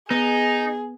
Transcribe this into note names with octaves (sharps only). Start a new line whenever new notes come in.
B3 D#4 G#4